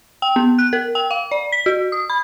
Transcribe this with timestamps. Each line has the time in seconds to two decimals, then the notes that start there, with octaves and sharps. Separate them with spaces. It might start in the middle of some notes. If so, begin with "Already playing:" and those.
0.22 G5
0.36 B3
0.59 F#6
0.73 A#4
0.95 G5
1.11 F5
1.31 D5
1.52 B6
1.66 F#4
1.92 D#6
2.10 B5